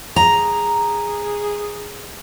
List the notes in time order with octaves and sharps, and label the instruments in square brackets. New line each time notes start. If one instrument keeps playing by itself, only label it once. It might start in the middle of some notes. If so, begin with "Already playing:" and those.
[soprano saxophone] G#4 [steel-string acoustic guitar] A#5